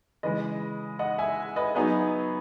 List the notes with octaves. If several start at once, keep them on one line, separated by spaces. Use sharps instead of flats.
C#3 E3 G#3 B4 D#5
D#5 F#5
E5 G#5
B4 D#5
F#3 B3 D#4 G#4 B4